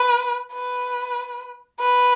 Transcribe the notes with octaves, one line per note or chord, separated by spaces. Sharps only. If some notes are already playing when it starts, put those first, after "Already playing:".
Already playing: B4
B4
B4